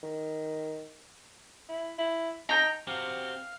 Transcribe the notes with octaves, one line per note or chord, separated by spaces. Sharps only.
D#3
E4
E4
D#4 G5 A#5
C4 F#4 G4 F5